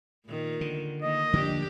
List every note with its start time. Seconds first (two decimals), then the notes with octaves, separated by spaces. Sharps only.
0.27 A#2 D#3
0.61 D3
1.02 D#3 A#3 D#5
1.33 D3 F3 A#3 D4 G4